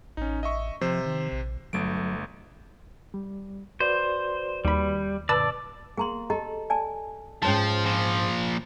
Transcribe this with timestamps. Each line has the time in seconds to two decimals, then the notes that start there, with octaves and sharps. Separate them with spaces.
0.17 A1 C#4 D#4
0.43 D#5 E5 C#6
0.81 C3 F3 C5
1.06 D#3
1.32 A#1
1.73 G1 F#3 A3 D7
3.14 G3
3.80 F#4 B4 C5 D5
4.65 D#2 G3 B5
5.29 F#2 A#2 D3 B4 D5 A5 E6
5.97 A#3 G#4 A#5 C6
6.30 G4 A4 D#5 A#5
6.70 D5 G#5 A5
7.42 F2 G#2 F3 C#4 C#5 A5
7.86 A#2 F3